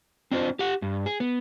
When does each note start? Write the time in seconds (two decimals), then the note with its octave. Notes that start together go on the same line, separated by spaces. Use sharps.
0.31 C4 D4 F4 C5
0.59 G4 F#5
0.82 G2
1.06 G#4
1.20 B3